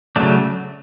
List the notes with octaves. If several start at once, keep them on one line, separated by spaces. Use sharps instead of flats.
C#3 F#3 A3 D4